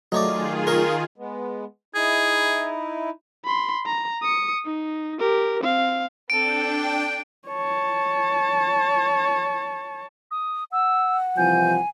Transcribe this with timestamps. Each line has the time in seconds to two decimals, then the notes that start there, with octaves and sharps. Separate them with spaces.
0.12 D#3 F#3 A3 D#4 F4 G#4 C#5 D5
0.67 A#4 C#5
1.16 G#3 B3
1.95 D#4 E4 G#4
3.45 B5 C6
3.86 A#5
4.23 D#6 C#7
4.65 D#4
5.19 G4 A#4
5.64 C4 F5
6.30 C4 D4 A4 G5 D7
7.48 C#5 A5
10.31 D#6
10.72 F#5 E6
11.37 C2 E3 F3 G#5 G6